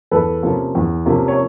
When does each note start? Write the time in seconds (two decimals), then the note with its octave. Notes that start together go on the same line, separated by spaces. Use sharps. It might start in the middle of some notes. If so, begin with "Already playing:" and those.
0.11 E2 A4 B4
0.43 C3 F3 A#3 C#4
0.75 E2
1.06 C3 F3 A#3 C#4
1.28 C#5